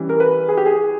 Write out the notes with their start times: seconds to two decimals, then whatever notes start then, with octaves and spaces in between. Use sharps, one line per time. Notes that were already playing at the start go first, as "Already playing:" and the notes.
Already playing: E3 G3 C#4
0.09 A#4
0.20 B4
0.49 G#4
0.57 G4
0.66 G#4